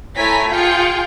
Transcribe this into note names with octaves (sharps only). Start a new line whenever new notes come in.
A3 E4 C#5 G#5 A#5 B6
F4 G#4 G5 G6 C#7